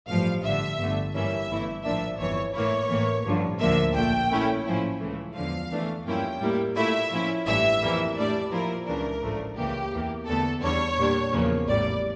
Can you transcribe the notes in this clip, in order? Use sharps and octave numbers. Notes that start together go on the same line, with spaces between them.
A1 G2 F3 F5
A1 G2 D3 E5
G1 G2 D3 A3
G2 E3 G3 A#3 C#4 E5
G1 G2 E3 A3 E4
A#1 A2 F3 A#3 D4 E5
G1 F2 E3 C#5
A2 E3 A#3 E4 C#5
A1 A2 E3 A#3
A1 G2 D3 F3
D2 D3 F3 A#3 E5
A#1 A#2 A3 G5
A#2 A3 C#4 E4
A2 F3 C#4 E4
C#2 C#3 E3 A3
E2 D3 F3 F5
E2 E3 A3 D4
G2 F3 A#3 C#4 E4 G5
A2 G3 A#3 E4
A#2 A3 E4 E5
A#2 F3 C#4 E4
A1 G2 E3 E5
F2 E3 G3 A#3 E4
A2 G3 D4 D5
A#2 F3 A#3 E4 A#4
C#2 C#3 E3 A#3 D4 A#4
A1 A2 F3 A3 D4
C#2 C#3 E3 A#3 G4
E2 E3 A#3
E2 D3 A3 A4
E2 D3 G3 D4 C#5
A#2 G3 D4
E2 C#3 F3 A#3
A1 A2 G3 D5